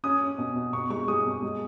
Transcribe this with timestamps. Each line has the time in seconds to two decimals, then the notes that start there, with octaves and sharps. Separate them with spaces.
0.04 C#4 D#6
0.21 C#4
0.38 B2
0.56 B2
0.73 B2 C#6
0.90 G#3 C#6
1.08 G#3 D#6
1.25 B2
1.43 G#3